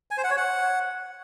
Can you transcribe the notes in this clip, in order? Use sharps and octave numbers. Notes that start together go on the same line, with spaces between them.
G#5
C5
F#5
C#5
F#5